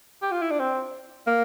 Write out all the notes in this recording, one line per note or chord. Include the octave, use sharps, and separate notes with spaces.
G4
F4
E4
D4
C4
A#3